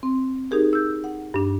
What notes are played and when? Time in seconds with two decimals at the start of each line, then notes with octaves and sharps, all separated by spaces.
0.03 C4
0.51 D#4 G4 G#4 A#4
0.73 E6 G6
1.04 F#5
1.34 G2 D4